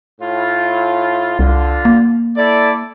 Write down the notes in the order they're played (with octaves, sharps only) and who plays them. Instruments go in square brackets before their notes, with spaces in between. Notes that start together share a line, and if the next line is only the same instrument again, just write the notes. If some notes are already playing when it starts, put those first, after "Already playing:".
[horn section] A2 F4
[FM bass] C2 [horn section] D3 F4
[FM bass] A#3
[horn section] E4 A4 D5